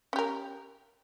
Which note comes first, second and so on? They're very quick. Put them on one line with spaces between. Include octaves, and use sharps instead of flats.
C#4 G4 A#4